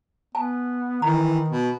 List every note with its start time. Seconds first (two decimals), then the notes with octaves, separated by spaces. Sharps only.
0.35 B3 G#5 A5
1.02 D#3 E3 A#5
1.48 B2